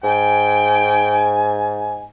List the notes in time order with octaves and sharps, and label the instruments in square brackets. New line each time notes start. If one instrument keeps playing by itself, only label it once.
[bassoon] G#2 [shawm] G5 [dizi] G#5